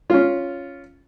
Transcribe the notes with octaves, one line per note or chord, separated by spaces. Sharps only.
C#4 F4